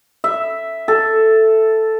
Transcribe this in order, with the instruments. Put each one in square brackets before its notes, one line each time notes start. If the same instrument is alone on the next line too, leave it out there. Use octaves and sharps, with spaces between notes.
[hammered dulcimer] E5
A4